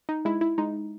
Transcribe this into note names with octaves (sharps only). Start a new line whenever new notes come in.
D#4
G#3 E4
E4
G#3 D#4